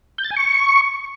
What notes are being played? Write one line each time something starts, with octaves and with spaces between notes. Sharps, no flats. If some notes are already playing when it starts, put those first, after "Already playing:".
G6
A6
G#5
C#6